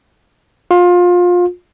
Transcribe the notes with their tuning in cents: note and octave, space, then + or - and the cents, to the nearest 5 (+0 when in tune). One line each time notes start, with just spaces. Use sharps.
F4 +25